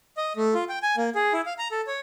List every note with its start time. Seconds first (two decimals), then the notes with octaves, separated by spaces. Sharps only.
0.17 D#5
0.37 A3
0.54 F4
0.69 G5
0.83 G#5
0.97 A#3
1.15 G#4
1.33 E4
1.46 F5
1.58 A#5
1.72 A4
1.87 C#5